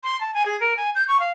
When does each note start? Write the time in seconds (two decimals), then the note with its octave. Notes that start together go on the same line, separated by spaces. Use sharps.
0.03 C6
0.20 A5
0.34 G#5
0.45 G#4
0.60 A#4
0.77 G#5
0.95 G6
1.08 C#6
1.19 F5